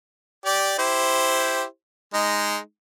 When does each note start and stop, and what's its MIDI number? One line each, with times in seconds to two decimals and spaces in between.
0.45 0.74 67
0.45 0.74 74
0.79 1.63 64
0.79 1.63 67
0.79 1.63 72
2.13 2.57 56
2.13 2.57 63